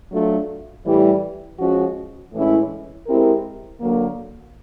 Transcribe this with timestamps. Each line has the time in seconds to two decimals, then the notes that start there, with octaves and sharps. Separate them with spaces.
0.12 F#3 A3 D4 F4
0.85 A2 E3 G3
1.59 F3 G#3 C#4 F#4
2.33 A2 E3 G#3 C#4 E4
3.07 G#3 C4 E4 G4 A#4
3.81 D3 F#3 A#3